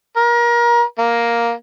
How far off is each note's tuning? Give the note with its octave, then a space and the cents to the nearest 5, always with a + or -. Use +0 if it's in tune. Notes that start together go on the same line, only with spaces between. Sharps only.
A#4 +30
A#3 +5